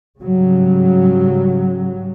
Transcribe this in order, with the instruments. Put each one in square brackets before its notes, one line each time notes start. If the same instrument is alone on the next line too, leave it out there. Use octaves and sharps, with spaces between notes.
[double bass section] G#2 C#3 F#3 G3